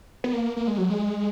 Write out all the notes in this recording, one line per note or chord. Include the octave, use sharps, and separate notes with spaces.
B3
A#3
A#3
G#3
F#3
G#3